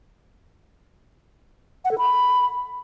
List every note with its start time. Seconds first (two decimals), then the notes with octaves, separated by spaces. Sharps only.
1.85 F#5
1.91 A4
1.98 B5